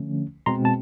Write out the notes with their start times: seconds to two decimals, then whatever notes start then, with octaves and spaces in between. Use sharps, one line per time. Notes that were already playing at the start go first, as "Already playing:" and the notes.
Already playing: D3 F3 A3 C#4
0.46 B2 G#3 C4 A#5 C6
0.65 A5